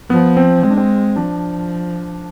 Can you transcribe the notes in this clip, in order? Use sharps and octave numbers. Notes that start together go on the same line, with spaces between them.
F3 B3
C4
G#3 C4
D4
C4
F3 D4